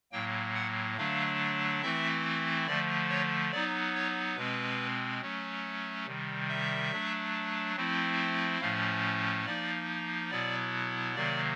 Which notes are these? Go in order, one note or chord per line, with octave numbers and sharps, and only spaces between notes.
A2 F#3 A#3 G5
F#5
D3 F#3 A3 D4 F5
E3 A3 C4 E4 E5
D3 F3 A3 D5
C#5
F#3 B3 D#4 D5
C#5
B2 G#3 C4 B4
F#3 A3 C#4
C3 D#3 G3
E5
F#3 A3 D4
F3 A3 C4 E4
A2 F3 A3 C#4 F5
F3 A#3 D#4 D5
B2 F#3 B3 E4 D5
C3 D#3 F#3 A#3 D5